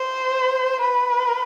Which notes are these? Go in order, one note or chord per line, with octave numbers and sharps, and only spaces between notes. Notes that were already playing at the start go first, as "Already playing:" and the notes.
Already playing: C5
B4